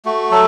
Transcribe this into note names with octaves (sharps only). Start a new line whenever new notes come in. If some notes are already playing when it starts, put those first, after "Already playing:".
A3 F#4
F#3 A4